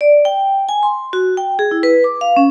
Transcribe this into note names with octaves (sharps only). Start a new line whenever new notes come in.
D5
G5
G#5
C6
F#4
G5
G#4
E4
B4
D6
F5
C#4